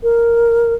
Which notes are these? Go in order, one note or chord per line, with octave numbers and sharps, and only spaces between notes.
A#4